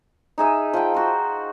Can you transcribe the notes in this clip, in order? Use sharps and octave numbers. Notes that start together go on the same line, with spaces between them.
D#4 G#4 E5 G#5
F3 G5
F#4 C5